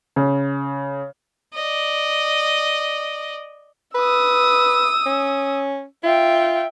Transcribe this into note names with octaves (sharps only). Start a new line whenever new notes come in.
C#3
D5 D#5
B4 D#6 E6
C#4
F4 E5 G5